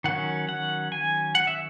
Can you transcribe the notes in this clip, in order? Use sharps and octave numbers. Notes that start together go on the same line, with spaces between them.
D#3 F#3 C#4 F#5
F#5
G#5
F#5
E5